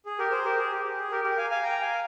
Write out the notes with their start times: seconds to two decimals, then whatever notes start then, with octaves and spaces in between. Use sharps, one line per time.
0.06 G#4
0.19 G4 A#4
0.31 G#4 C5
0.45 G4 A#4
0.58 G#4
0.72 G4
0.85 G4
0.98 G#4
1.11 G4 A#4
1.24 G4 A#4
1.37 F5 G#5
1.50 F5 G#5
1.63 G5 A#5
1.81 F5 G#5